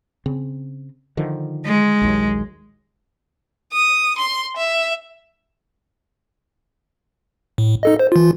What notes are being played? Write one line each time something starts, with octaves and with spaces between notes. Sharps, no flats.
C#3 C4
D3 D#3 F3
G#3
A#1 D#2 F#3
D#6
C6
E5
A2
D#4 A4 D#5
C5
E3 F4